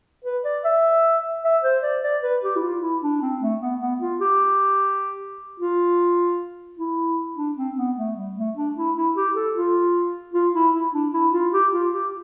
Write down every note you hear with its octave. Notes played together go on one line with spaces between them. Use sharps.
B4
D5
E5
E5
C5
D5
D5
B4
G4
E4
F4
E4
D4
C4
A3
B3
B3
F4
G4
F4
E4
D4
C4
B3
A3
G3
A3
D4
E4
E4
G4
A4
F4
F4
E4
E4
D4
E4
F4
G4
F4
G4